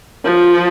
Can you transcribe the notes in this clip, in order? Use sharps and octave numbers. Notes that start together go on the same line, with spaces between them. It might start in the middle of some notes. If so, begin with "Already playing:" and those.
F3